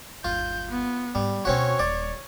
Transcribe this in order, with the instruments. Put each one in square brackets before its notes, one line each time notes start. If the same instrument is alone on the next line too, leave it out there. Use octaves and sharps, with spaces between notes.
[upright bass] G1 D#2 [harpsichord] F4 [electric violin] G6
[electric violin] B3
[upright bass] G#2 [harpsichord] G3
[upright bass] D2 B2 [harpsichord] C4 C#4 F#4 [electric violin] C#5
[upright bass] D#1 [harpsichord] D5